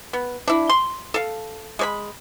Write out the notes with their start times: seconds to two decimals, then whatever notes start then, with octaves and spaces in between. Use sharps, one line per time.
0.13 B3
0.47 D4 E4
0.69 C6
1.14 A4 F5
1.79 G#3 C#5 B5